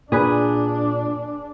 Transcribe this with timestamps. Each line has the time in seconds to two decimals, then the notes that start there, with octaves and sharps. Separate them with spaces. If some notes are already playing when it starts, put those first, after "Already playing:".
0.12 A#2 D4 G#4 B4